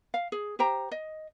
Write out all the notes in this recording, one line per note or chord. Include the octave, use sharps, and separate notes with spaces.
F5
G#4
G4 C5 G5 A#5
D#5